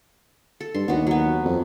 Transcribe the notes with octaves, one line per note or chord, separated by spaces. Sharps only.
A4
G2 C6
D#2 B3 F#4
F#3 B3
F2